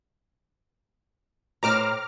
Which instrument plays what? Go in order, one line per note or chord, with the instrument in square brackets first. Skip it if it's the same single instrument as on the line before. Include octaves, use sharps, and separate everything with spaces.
[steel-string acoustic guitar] A2 C5 [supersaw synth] A#5 D6 F6